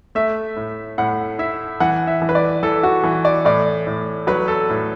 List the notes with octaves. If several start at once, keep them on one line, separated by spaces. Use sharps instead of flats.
A3 E5
A2
A2 F#5
E4 E5
E3 F#5
E5
E3
B4
D5
E3 A4
F#4
E3
D5
A2 D5
A2
F#3 B4
A4
A2